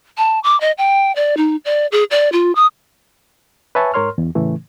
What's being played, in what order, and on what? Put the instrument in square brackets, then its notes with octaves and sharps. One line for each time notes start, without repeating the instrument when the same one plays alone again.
[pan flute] A5
D6
D#5
G5
D5
D#4
D5
G#4
D5
F4
D#6
[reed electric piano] B4 C#5 E5 G#5 A5 C#6
G#2 A#4 C#5 C6 F6
E2
A2 C#3 E3 A3